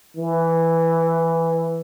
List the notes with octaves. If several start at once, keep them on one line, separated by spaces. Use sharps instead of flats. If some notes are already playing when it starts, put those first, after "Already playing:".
E3